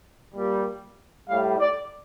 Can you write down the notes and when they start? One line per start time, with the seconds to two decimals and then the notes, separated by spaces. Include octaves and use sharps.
0.35 A#2 G3
1.27 A2 G3 F5
1.59 D5